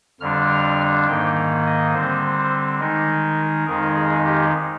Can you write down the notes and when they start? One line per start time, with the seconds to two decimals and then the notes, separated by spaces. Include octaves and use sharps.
0.20 F2 D3 G3 D4 F6
1.08 G#2 D#3 A#3 G5
1.66 D#5
1.93 D3 G3 C4 C5
2.80 D#3 G#3 D#4 A#4
3.66 F2 D#3 G#3 D#4 A#4
3.95 G#4
4.24 G4